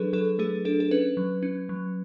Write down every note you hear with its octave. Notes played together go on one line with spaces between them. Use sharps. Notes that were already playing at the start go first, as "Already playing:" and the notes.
Already playing: F#3 D4 G#4 A4 B4
F#3 A4
A3 G#4
D4 A4
A4
C#4 B4
F#3
C#4
F#3